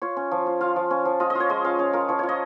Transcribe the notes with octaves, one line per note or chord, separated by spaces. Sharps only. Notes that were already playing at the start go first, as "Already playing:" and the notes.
F4 C#5
C#4
F3
F4
F4 F5
F3
C#4
F3
F4 D#5
D#5
F4
C#5
G#3 D#5
C#4 F5
C#4 C#5
F4 A#4
F3 C#5
F4 C#5
D#5